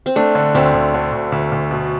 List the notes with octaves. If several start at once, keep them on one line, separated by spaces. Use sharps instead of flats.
C4
A3 D4
D3
D2 C4
D2
D3
D2
D2
D2
B2